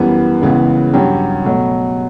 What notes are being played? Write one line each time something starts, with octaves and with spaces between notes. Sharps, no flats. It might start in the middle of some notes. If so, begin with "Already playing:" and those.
Already playing: F#2 E3 G3 B3
C#2 C#3 E3 B3
G2 F#3 C#4 G4
B2 F#3 A3